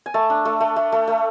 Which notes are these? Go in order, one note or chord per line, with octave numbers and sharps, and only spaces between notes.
G#5
A3 A5
D4
A3
A3
A3
A3
A3